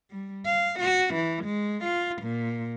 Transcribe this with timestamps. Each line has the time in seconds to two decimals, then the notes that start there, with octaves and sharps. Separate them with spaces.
0.10 G3
0.46 F5
0.79 F#4
1.14 E3
1.44 G#3
1.84 F4
2.22 A#2